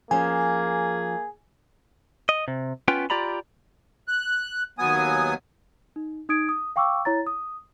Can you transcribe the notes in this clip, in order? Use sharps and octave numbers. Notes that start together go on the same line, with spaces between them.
F3 A#3 C#4 G#4 G#5
D#5
C3
B3 C#4 F4 B4 G5
F4 G4 D5 A#5 B5
F#6
D#2 F#3 B3 G#5 D#6
D#4
D#4 D#6 G#6 D7
D#6
F5 G5 C#6 D6 E6
E4 C#5 A#5 A6
D#6